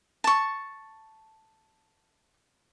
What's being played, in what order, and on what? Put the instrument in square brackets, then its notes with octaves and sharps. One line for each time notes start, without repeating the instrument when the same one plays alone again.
[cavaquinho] A5 C#6